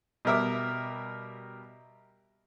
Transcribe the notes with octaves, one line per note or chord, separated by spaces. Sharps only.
B2 G3 A#4 E5 D6